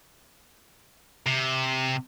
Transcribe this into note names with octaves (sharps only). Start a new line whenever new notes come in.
C3